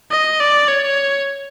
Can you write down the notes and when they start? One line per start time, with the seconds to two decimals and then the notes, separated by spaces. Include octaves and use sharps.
0.11 D#5
0.40 D5
0.68 C#5